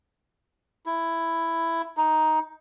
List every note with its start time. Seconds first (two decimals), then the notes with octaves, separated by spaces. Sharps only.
0.86 E4
1.97 D#4